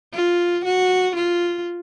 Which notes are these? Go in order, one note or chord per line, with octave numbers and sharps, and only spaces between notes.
F4
F#4
F4